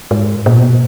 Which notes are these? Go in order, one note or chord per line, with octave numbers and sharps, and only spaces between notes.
G#2
A#2
B2